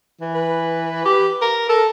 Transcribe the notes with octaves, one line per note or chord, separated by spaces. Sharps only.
E3
B4
G4
A#4
A4 A#4